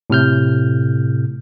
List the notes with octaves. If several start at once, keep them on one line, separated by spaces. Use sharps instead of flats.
A2 C3 F6 G6